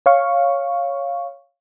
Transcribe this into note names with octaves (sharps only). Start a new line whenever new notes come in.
C#5 F5 C#6